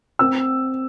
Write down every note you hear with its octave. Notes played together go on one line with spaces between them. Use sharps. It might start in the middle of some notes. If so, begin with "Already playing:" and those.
C4 E6